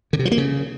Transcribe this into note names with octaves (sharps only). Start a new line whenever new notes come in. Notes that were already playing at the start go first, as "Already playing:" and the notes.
D3
C3
F3
A#3
C#3